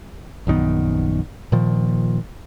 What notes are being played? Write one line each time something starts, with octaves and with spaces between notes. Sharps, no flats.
A#1 F#2 D#3 B3
A#2 D#3 F3